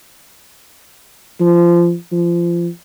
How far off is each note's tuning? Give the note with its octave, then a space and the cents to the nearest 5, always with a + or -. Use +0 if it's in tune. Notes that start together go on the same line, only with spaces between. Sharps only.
F3 -20
F3 -25